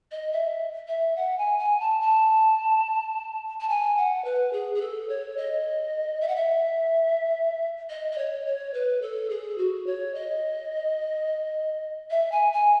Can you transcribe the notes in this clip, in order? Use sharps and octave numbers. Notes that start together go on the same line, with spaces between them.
D#5
E5
E5
F#5
G#5
G#5
A5
A5
A5
G#5
F#5
B4
G#4
G#4
A4
C#5
D#5
E5
F#5
E5
D#5
D#5
C#5
C#5
B4
A4
G#4
F#4
C#5
D#5
E5
G#5
G#5